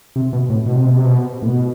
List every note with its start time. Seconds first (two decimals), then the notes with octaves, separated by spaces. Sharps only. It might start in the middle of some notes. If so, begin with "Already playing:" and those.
0.16 C3
0.33 B2
0.50 A2
0.66 B2
0.75 C3
0.86 B2
0.96 C3
1.06 B2
1.42 A2
1.47 B2